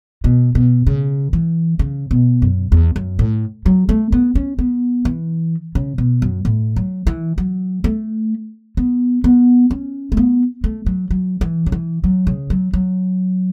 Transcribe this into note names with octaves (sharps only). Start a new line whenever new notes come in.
B2
B2
C#3
E3
C#3
B2
F#2
E2
F#2
A2
F#3
A3
B3
C#4
B3
E3
C#3
B2
F#2
A2
F#3
E3
F#3
A3
B3
B3
C#4
A3
B3
A3
F#3
F#3
E3
C#3
E3
F#3
C#3
F#3
F#3